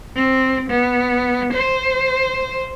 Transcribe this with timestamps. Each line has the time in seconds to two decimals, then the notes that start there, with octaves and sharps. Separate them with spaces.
0.16 C4
0.70 B3
1.53 C5